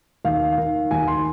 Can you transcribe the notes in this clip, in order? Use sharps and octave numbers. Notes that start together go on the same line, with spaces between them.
D#2 F5
D#3
D#2 G#5
C6